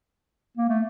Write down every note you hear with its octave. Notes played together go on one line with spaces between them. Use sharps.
A#3
A3